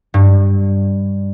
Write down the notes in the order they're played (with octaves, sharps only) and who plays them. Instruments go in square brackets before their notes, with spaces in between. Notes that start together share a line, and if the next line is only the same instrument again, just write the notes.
[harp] G2